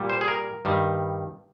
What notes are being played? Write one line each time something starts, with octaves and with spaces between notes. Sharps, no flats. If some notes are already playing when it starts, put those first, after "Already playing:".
Already playing: A#2 G3
C5
G#4
A#4
G2 D#3 G3